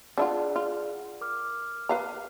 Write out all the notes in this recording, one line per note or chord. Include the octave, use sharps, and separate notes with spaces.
D4 E4 F4 G#4 D5 F#5
F4
A#4 D6 F6
B4 F5 A#5